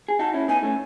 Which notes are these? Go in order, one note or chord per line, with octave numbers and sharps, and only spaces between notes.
G#4
D#4 F#4 A5
C#4 E4
B3 D#4 G#5
A3 C#4